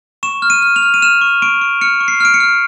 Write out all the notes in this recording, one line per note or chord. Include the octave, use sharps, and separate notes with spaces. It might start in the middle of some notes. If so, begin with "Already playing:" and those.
C#6 E7
F6
D#7
F6
F7
F6
D#7
F6 E7
C#6
C#6 D7
C#6
F6 C#7
C#6
C7
F6 D7
C#7
F6